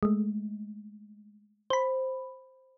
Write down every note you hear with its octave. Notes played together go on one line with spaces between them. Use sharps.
G#3 A3
C5 B5